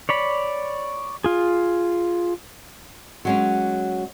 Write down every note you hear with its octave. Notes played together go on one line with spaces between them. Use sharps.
C#5 D5 B5
F4 G#4
F#3 G#3 C#4